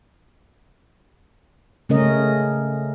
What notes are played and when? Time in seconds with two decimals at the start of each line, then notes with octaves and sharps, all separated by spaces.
1.89 C#3 A3 C#4 A#4 D#5